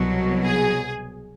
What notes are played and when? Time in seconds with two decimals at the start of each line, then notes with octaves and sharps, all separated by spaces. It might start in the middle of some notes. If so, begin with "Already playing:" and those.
Already playing: C2 B2 F#3
0.44 G#4